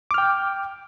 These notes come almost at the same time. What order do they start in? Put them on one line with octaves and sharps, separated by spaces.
D6 F6 G5